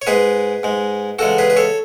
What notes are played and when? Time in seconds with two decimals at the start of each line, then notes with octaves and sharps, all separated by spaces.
0.02 C#5
0.07 G#2 G#3 G#4 B4
0.63 G#2 G#3
1.19 E2 C#3 G#3 F#4 A4
1.38 G#4 B4
1.50 B4
1.57 A4 C#5